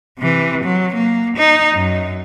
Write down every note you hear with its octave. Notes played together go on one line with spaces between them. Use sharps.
C3 E3
F#3
A#3
D#4
F#2